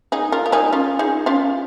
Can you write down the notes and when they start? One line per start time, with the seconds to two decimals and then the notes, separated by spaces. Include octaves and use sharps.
0.12 D#4 G#4
0.32 F4 A#4
0.46 A#4
0.52 D#4 G#4
0.73 C#4 F4
0.99 D#4 G#4
1.26 C#4 F4